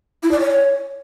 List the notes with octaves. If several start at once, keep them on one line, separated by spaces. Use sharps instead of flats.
E4
D5
C#5